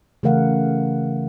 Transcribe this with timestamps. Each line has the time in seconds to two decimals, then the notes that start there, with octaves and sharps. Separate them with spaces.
0.23 C#3 E3 A3 A#4 F5 F#5